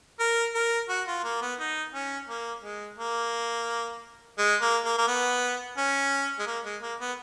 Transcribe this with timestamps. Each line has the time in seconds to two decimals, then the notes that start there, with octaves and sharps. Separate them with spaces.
0.20 A#4
0.55 A#4
0.89 F#4
1.07 F4
1.24 A#3
1.42 B3
1.60 D#4
1.94 C#4
2.29 A#3
2.64 G#3
2.98 A#3
4.38 G#3
4.61 A#3
4.85 A#3
4.98 A#3
5.08 B3
5.77 C#4
6.39 G#3
6.47 A#3
6.65 G#3
6.82 A#3
7.00 B3